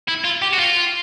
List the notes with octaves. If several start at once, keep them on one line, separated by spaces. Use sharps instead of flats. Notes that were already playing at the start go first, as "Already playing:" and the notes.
E4
F4
G4
F#4
F4